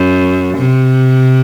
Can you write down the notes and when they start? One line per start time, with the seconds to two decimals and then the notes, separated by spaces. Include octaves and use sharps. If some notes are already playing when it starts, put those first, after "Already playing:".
Already playing: F#2
0.58 C3